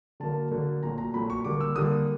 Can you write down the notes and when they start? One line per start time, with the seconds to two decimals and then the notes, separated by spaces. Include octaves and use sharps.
0.20 D3 F#3 A#3 A5
0.51 D3 F#3 A#3
0.82 A#2 F#3 A3 A#5
0.98 A#5
1.14 A#2 F#3 A3 B5
1.30 C#6
1.45 D3 G3 A#3 D6
1.61 E6
1.76 D3 G3 A#3 D#6